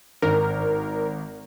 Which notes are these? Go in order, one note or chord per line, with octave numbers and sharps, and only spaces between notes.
G#1 A#4